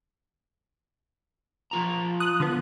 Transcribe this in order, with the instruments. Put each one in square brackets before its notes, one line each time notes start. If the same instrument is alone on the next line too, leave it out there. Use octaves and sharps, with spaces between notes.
[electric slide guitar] F3 F4 A#5
[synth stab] D#6 F#6
D3 F3 B3